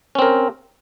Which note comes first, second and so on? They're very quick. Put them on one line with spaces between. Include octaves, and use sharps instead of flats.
C#4 C4 A#4